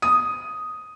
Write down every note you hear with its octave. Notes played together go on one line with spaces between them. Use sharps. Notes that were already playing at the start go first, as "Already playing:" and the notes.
D#6